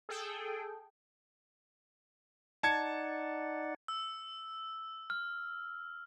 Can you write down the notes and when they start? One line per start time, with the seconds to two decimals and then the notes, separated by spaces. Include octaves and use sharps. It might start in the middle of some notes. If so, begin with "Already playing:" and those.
0.09 G#4 A4 G5
2.63 D#4 D5 F#5 A5 G#6 C#7
3.88 E6
5.10 F6